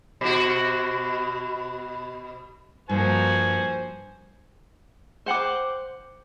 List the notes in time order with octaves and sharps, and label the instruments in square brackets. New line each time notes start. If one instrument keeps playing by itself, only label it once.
[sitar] B2 F#4
[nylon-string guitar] G2 [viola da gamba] F3 A#3 F#4 [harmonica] C5 G#5
[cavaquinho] C5 F#5 G5 D6